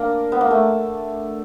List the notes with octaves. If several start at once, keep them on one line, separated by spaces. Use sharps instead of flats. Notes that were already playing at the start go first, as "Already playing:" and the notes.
Already playing: A#3 D4
B3
A#3
A3